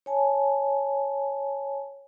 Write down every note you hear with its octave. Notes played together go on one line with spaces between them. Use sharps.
C#5 G#5 A5